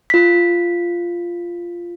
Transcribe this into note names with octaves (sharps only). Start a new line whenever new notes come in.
F4 B6